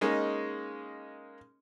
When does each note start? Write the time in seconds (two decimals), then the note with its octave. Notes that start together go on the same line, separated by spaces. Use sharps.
0.01 G#3 A#3 C#4 D#4